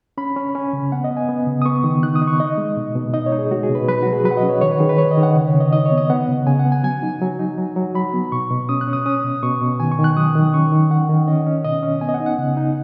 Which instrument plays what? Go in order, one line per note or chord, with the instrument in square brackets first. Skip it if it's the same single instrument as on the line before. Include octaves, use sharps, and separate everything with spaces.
[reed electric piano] C#4 B5
C#4
C#4 G#5
C#3
B3 F#5
D#5
B3
G#5
B3
C#3
D#6
B3 C#6
D#3
D#4 F#6
D#6
D#4
C#6
D#4 D#5
G#3
B2
B2
D#4 D#5
C#5
D#4
G#4
G#3 F#4
G#4
B2
B4
F#3 B4
F#3 F#4
G#4
F#3 B4
F#5
D#5
C#4
C#5
D#3 C#5
B4
D#3 G#4
B4
D#3 C#5
D#5
D#3
F#5
C#3
C#5
C#3
D#5
D#4 D#5
C#5
B3
D#5
B3 F#5
C#3
C#3 G#5
F#5
B3
G#5
F#3 G#5
D#4
F#3
D#4
F#3
F#3
F#3 B5
B3
B2 C#6
B2
C#4 D#6
F#6
C#4
D#6
C#4 D#6
B2
B2 C#6
B2
D#3 G#5
C#6
D#3
F#6
F#3 D#6
D#3
C#4 C#6
D#3
D#3 F#5
D#3
C#4 D#5
C#4
B2 D#5
C#4
B3 G#5
D#5
F#5
D#4
F#5
C#3
D#4